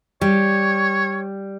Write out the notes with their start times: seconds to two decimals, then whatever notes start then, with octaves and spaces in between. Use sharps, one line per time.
0.21 G3 C#5